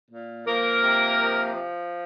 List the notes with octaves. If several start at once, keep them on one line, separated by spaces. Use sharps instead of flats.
A#2
F3 A#3 A#4
C3
F3
F3